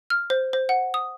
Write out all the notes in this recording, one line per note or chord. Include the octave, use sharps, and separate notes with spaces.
F6
C5
C5
F#5
D#6